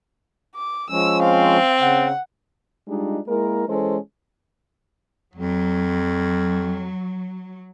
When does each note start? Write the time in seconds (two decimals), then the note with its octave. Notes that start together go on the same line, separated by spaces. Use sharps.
0.56 D6
0.90 F3 G#3 C#4 E6
1.22 C4 F5
1.80 C#3 F#5
2.88 G3 G#3 D4 D#4 F4
3.28 G#3 A#3 E4 A#4
3.67 E3 G#3 C#4 A4 C5
5.36 F2 F#3